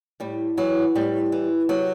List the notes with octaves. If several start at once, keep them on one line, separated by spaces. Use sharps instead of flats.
A2 G3
E3 F#3
A2 G3
E3
C3 F#3